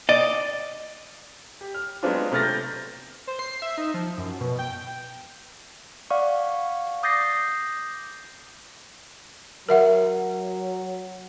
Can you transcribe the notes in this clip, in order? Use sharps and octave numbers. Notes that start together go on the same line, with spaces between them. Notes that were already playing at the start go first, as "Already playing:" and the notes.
D5 D#5
G4
F6
F#3 G#3 B3 C4 D4 F4
C3 A3 B3 F6 A6 A#6
G6
C5
C7
E5
D#4
F3
F#2
B2
G5
D5 F5 F#5 C#6
D6 D#6 G6 A6 A#6 C7
F#3 A#4 E5 F#5